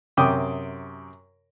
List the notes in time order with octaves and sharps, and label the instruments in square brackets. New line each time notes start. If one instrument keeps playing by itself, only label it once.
[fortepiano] F#2 C3 G5 D6 D#6